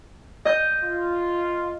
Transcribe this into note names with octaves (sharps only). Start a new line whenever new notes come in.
D#5 G6
F4